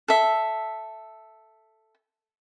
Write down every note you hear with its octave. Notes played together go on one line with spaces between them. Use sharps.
A4 E5